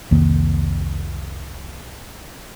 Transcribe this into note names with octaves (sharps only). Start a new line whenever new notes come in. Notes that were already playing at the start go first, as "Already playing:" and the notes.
C2 F2 D#3 A#3